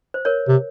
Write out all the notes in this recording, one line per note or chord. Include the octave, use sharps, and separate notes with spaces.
C5
A#4 C#5
C3